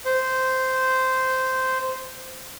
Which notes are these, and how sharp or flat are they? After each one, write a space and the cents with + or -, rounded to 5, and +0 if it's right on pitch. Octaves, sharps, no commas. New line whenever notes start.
C5 -10